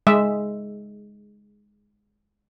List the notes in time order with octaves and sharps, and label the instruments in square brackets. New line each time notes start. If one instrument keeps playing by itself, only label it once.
[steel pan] G#3 E5